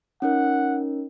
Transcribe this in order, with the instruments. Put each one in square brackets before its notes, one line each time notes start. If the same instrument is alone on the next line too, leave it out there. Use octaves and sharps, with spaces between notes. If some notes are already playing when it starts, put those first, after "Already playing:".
[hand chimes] C#4 D#4 A#4 [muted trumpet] F#5